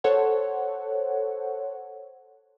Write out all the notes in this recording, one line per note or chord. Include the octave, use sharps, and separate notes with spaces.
A4 C5 C#5 F#5